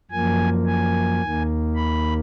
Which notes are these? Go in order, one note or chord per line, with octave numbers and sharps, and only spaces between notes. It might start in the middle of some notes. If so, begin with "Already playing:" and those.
F#2 F3 A#3 G#5
G#5
D#2 D#3 A#3
B5